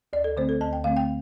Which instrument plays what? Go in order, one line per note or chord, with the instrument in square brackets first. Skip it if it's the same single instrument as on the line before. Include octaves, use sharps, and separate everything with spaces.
[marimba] D2 D5
A4
D3 A3 C4 C5
A4
D2 A5
G5
D3 A3 C4 F5
G5